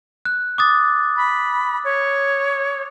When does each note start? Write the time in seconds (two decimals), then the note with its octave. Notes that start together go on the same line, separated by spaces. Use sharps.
0.25 F#6
0.58 D6 D#6 A6
1.17 B5
1.84 C#5